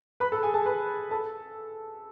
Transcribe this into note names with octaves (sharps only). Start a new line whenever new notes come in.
B4 B5
A4 A5
G#4 G#5
A4 A5
B4 B5
A4 A5